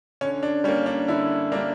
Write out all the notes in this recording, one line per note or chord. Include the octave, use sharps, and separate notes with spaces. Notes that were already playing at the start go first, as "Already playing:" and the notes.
D3 C#4
D4
G3 A#3 C#4
D4
D3 E4
G3 A#3 D4